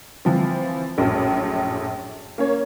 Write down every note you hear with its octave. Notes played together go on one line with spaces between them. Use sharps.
E3 F3 C4
A#1 F#2 A2
A#3 C#4 C#5